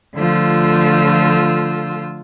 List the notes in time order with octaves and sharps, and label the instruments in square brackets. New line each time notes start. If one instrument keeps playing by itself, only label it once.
[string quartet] D3 F3 A3 F4 E6